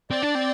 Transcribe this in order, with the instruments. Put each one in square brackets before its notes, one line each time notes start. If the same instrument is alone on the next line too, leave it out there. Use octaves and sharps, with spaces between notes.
[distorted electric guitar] C4 [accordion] D5
[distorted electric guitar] D4
C4